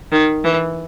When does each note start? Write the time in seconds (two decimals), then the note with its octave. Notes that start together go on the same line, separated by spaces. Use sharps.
0.12 D#3
0.44 E3